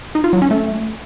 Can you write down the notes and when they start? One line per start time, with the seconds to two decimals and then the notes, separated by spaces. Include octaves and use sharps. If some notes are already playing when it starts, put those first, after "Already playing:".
0.15 D#4
0.24 F4
0.33 F#3
0.42 C#4
0.51 A3